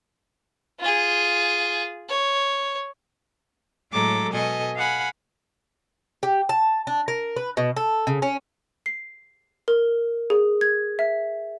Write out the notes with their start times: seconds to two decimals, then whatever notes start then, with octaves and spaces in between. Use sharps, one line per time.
0.80 F4 G#4
2.09 C#5
3.92 A2 F#3 G#3 A4 A#5 D6
4.31 B2 A4 D#5 G#5
4.75 F5 F#5 G#5 B5
6.23 G4
6.49 A5
6.87 D4
7.08 A#4
7.36 B4
7.57 B2
7.76 A4
8.07 C#3
8.22 C#4
8.86 C7
9.68 A#4
10.30 G#4
10.61 G#6
10.99 E5